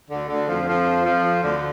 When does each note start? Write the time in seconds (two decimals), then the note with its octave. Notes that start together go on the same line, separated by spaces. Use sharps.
0.10 D2 D3
0.29 D2 D3
0.48 F2 F3
0.67 F2 F3
1.05 F2 F3
1.42 D2 D3